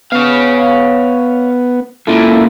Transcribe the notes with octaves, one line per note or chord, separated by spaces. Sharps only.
B3 C#5 F5
C#2 A#2 E4 A4